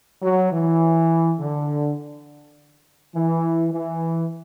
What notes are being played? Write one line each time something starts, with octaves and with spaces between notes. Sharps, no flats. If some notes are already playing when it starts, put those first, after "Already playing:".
F#3
E3
D3
E3
E3